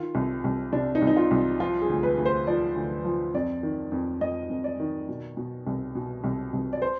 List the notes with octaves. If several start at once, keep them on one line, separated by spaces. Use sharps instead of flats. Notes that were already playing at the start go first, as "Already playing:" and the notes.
Already playing: D#3 F4
C2
C2
C3 D4
D#4
C2
D#4
F4
C2
F3 F4
G#4
D2
B4
D2
C5
F3 D5
D2
F3
F2 D5
D#3
F2
F2 D#5
F2
D5
D#3
B2
B2
C2
B2
C2
C2
D5
C5